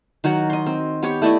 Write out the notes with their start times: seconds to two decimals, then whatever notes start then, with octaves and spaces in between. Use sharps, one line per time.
0.24 D#3 F#3 F#4 F#5
0.50 D#5 C6
0.66 C4
1.03 B3 G4 C#5 C#6
1.22 A3 E4 D5 D#5